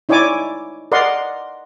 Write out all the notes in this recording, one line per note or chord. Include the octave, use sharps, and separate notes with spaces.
D#4 E4 C#5 D5 G#5 D6
A#4 D5 D#5 F#5 C6